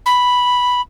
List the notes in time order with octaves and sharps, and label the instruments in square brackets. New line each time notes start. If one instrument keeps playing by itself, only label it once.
[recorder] B5